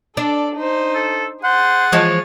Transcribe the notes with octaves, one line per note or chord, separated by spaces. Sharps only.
D4 A4 D5
D#4 C5
A4
G#4 C5 F#5 A6
E3 F3 G#3 C#5